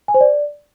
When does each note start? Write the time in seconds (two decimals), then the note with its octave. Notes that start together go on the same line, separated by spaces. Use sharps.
0.08 G#5
0.14 C5
0.21 D5